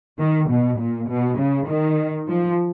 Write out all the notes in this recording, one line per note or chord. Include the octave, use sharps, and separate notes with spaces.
D#3
B2
A#2
B2
C#3
D#3
F3